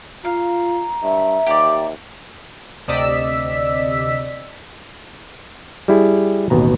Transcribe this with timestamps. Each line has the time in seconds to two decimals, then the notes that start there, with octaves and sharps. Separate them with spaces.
0.25 F4 F5 A#5
1.03 G2 E5
1.47 D#2 G4 D5
2.87 D2 C3 D5 D#5 E6 B6
5.88 G3 E4 G#4
6.50 A1 D#2 B2 A#5